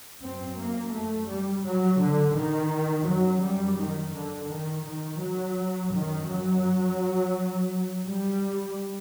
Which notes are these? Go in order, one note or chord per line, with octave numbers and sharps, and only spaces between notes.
F#2 C4
A#3
A3
G3
F#3
D3
D#3
F#2 F#3
G3
D#3
D3
D#3
D#3
F#3
F#2 D#3
F#3
G3